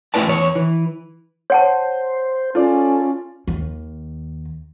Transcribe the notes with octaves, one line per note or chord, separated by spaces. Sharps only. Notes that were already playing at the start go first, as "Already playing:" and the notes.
A2 E4 B4 D5 A5
E2 C#5
E3
C5 C#5 F#5 A5
C#4 F4 A4 D5
D#2